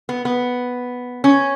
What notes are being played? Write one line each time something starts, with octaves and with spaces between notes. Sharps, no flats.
B3
B3
C#4